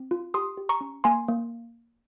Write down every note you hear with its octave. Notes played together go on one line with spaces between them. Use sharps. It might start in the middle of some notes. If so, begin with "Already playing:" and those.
Already playing: C4
F4
G4 C6 D#6
G4
A#5 C#6
C#4
A#3 G#5 C6
A#3